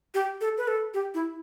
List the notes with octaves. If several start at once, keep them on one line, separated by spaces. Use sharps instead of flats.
G4
A4
B4
A4
G4
E4